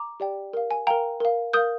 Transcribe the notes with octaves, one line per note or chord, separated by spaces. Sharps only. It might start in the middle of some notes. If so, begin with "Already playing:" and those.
Already playing: A#5 D6
G4 D5 G5
A#4 F5
G#5
A#4 F5 G5 A#5
A#4 F5
A#4 F5 D#6 G6